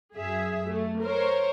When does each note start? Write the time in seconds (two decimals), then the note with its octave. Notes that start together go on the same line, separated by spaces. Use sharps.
0.16 F#2 G#4 E5
0.69 A3
1.02 A#4 C5 C#5